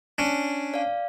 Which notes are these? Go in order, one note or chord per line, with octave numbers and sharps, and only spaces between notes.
C#4 D4
D5 F5